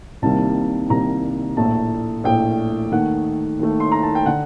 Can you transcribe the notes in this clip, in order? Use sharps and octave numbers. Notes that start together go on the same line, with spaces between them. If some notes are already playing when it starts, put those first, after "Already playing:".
C2 C3 D#3 G3 A#3 A5
C2 C3 D#3 G3 A#3 A#5
A#1 A2 A3 A5
A#1 A2 A3 G5
D#2 D#3 A3 F#5
D#2 D#3 A3
C6
A#5
A5
G5
D3 F#5